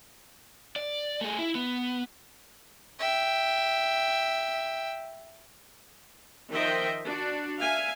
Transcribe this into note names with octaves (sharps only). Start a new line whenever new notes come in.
D5
A3 G#4
E4
B3
E5 G5
D#3 F3 C5 D#5 E5 G5
D4 F#4
E5 F5 G#5